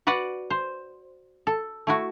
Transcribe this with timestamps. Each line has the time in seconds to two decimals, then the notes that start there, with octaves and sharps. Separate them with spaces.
0.07 F#4 B4 D5 F#5
0.50 C5
1.47 A4
1.87 A3 E4 F#4